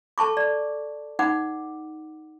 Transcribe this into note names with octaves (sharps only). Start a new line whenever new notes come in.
A4 A5 C#6 D6
D5
D#4 F#5 D6